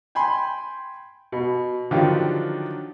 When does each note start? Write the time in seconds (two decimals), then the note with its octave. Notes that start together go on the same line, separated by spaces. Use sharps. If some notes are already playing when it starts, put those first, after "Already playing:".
0.15 G5 G#5 B5 C6
1.32 B2
1.91 D3 D#3 F3 F#3 F4 G4